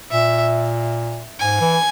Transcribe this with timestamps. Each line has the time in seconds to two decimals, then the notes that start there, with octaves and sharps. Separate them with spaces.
0.11 A#2 E5
1.40 G#2 G#5
1.60 E3